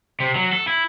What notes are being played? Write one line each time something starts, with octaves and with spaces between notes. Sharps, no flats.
C3
F#3
A4
E4